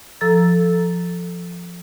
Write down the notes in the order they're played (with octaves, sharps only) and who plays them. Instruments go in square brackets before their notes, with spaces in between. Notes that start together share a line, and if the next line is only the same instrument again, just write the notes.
[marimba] F3 A4 A#5 E6 A6